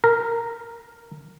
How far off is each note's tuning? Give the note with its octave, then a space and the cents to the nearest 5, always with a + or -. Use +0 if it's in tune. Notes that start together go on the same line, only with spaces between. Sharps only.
A#4 -5